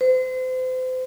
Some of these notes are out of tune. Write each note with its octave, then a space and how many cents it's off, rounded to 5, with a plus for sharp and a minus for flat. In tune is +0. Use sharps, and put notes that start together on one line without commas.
C5 -35